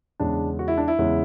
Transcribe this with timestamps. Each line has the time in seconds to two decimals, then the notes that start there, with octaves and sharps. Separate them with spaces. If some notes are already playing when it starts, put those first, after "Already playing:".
0.20 E2 C#3 G#3 D4
0.59 F#4
0.68 E4
0.78 D4
0.88 E4
0.99 E2 C#3 G#3